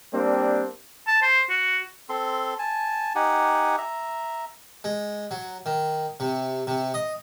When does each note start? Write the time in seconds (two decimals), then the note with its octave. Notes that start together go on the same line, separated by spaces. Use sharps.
0.13 G3 A#3 C4 D4
1.08 A5
1.22 C5
1.50 F#4
2.09 C4 A4 C6
2.59 G#5 A5
3.15 D#4 G4 F#5 G#5
3.78 E5 A#5
4.84 G#3
5.31 F#3
5.66 D#3
6.20 C3
6.67 C3
6.94 D#5